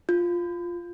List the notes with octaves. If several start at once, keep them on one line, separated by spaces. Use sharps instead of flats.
F4